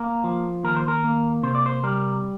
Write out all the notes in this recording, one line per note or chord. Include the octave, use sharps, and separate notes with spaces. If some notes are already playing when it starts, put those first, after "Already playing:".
Already playing: A#3 A#4
F3
D#2 A#4
C5
A#4
A#3
C3 C5
D5
C5
G3 A#4